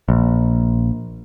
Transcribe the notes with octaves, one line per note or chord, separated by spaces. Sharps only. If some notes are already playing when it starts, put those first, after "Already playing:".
A#1